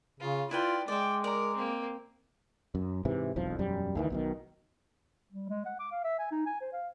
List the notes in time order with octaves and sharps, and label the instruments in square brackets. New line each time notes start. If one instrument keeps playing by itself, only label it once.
[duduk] C#3 [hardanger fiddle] F4
[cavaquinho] E4 B4 G5 [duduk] F4 [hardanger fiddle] D5
[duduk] G#3 [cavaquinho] D5 E5 [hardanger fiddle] G5
[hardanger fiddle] A#4 [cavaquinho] D5 A#5
[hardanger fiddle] A#3 C4
[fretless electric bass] F#2
G#2 C3 E3
E1 B1 F2 F3
E1 F#2 G3
D2 D#3 E3
B1 B2 D#3
[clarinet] G3
G#3
F#5
D6
F5
E5
G#5
D#4
G#5
C5
F5